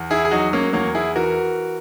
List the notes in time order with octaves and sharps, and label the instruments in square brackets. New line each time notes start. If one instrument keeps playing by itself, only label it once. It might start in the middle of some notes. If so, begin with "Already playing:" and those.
Already playing: [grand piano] E2
E4 G#4
G#4
F#3 D#4 F#4
A#3 C#4
E2 A#3 C#4
E4 G#4
E3 F#4 A#4